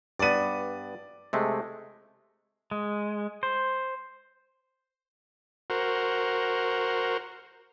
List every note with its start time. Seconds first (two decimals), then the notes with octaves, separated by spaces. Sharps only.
0.19 G2 B3 D5 D#7
1.33 C3 G#3 A3
2.71 G#3
3.43 C5
5.70 F#4 A#4 C5